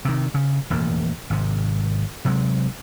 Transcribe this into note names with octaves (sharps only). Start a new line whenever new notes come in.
C3 D#3
C#3
E1 A1 F2 A#3
G#1 C3
C3 F#3 G#3